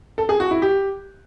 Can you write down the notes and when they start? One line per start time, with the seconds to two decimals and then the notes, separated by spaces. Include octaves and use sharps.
0.18 A4
0.29 G#4
0.40 F#4
0.51 E4
0.62 G4